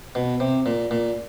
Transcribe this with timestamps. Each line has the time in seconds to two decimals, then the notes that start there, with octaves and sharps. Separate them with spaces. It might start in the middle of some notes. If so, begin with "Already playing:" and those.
0.15 B2
0.40 C3
0.66 A#2
0.91 A#2